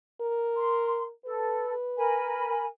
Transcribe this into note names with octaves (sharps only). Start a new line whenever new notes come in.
A#4
C6
A4 B4
A#4 G#5 B5